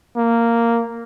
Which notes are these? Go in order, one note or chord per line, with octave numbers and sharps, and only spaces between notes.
A#3